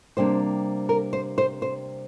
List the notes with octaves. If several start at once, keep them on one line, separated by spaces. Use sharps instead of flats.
C3 G3 A#3 D4 C5
A#4
C5
C5
C5